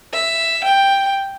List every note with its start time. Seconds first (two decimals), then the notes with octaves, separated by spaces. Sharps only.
0.13 E5
0.63 G5